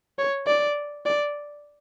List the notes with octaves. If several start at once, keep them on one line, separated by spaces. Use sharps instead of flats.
C#5
D5
D5